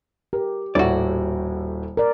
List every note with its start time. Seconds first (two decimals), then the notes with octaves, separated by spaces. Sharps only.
0.33 G4 A#4
0.75 D#1 A2 E4 F#4 C#5 D5
1.97 A#4 D5